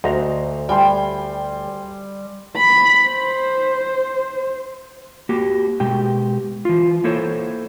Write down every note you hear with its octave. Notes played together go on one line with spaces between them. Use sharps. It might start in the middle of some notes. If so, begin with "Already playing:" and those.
D2 F#4 C5 D#5 A#5
G3 G5 G#5 C6
B5
C5
A#3 F#4 G4
B2 G#3 G4 G5
E3 F4
A#3 E4 A4 C5 C#5